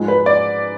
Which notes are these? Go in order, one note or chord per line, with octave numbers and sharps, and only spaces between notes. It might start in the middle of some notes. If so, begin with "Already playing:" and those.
Already playing: G#2 F3 G#3
B4
D5